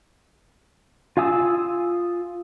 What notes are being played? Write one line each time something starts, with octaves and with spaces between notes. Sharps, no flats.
F4 F5 G#5 D#6 E6